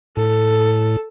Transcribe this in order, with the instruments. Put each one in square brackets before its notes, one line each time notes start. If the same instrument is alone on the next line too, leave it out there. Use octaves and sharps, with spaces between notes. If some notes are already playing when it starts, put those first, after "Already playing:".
[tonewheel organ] A2 [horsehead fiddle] A4